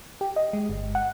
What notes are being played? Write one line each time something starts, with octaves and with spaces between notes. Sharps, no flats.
G4
D#5
G#3
G1
F#5